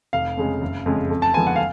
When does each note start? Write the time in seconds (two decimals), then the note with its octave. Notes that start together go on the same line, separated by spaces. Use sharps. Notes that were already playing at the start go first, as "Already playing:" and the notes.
0.13 F1 F5
0.37 F2 C#3 G#3
0.61 F#1
0.86 F2 C#3 G#3
1.10 F2
1.22 A5
1.34 D3 F3 G#3 B3 G#5
1.47 F#5
1.56 F5